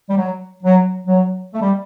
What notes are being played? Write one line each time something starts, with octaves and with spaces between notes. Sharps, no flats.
G3
F#3
F#3
F#3
A3
G3